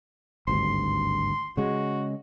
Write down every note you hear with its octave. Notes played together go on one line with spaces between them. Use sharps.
G#1 D2 G2 C6
C#3 G#3 F#4